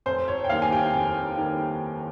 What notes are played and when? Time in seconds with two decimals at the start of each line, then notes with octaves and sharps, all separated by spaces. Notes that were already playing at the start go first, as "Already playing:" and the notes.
0.06 F1 C5
0.28 C#5
0.44 G5
0.49 D#2 D#3 G3 F5
0.62 G#5
0.72 G5
0.94 F1
1.37 D#3 G3